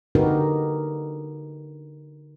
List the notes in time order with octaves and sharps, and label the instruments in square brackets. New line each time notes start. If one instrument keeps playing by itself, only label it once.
[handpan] D3 D#4 F#4 G4 A#4 B4